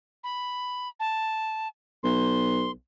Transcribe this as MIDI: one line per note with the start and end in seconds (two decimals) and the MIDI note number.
0.24 0.88 83
1.00 1.68 81
2.03 2.70 35
2.03 2.71 84